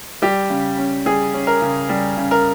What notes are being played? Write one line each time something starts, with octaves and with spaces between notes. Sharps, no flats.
G3 G4
C#3
C#4
G3 G#4
C#4
A#4
C#3
G3
C#3
A#4